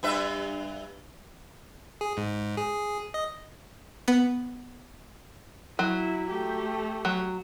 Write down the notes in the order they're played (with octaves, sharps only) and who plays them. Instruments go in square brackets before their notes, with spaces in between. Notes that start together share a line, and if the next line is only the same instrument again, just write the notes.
[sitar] G2 B4 E5
[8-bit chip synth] G#4
G#2
G#4
D#5
[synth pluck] B3
[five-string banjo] F#3 [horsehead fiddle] E4
[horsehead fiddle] A3 G4
[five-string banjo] F#3